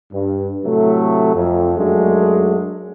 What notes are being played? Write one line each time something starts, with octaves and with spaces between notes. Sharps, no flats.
G2
A2 C3 F#3 A3
F2
F#2 F#3 G#3 A3 D4